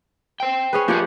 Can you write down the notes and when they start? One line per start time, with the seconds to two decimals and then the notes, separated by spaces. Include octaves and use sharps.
0.40 C5 G5
0.73 C#4 G#4 B4
0.88 F3 A#3 G4 G#4 F#5